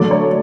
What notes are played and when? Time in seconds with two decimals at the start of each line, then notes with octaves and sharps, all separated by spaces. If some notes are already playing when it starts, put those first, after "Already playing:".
Already playing: D3 F#3 A3 D5
0.11 C#5